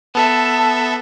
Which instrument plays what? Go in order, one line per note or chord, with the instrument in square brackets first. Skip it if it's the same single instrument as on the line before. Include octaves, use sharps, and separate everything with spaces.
[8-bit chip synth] B3 A4 E5 [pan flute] A5